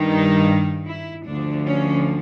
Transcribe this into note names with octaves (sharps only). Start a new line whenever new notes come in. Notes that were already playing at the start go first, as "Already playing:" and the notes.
Already playing: G2 D#3
D#4
E4
D2 D3 F3 D4
C#4